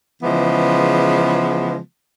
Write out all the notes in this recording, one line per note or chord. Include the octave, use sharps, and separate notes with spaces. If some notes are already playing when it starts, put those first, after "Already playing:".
C#3 E3 F3 G#3 B3